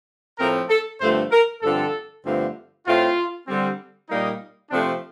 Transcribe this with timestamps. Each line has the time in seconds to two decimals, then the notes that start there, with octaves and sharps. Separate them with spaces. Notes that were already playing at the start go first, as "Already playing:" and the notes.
0.39 A2 F3 A3 C4 A#4
0.69 A4
1.01 G2 D3 F3 A3 C4 C5
1.32 A#4
1.62 G2 D3 F3 C4 A4
2.25 G2 D3 F3 A3 C4
2.86 A2 A3 C4 F4
3.48 D3 G3 C4
4.10 A#2 G3 A#3 D#4
4.71 C3 F3 A3 C4 D4